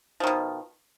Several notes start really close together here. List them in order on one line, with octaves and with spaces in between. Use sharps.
F3 D#3 B2